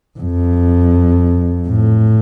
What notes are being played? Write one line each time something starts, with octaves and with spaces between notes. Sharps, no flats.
F2
A2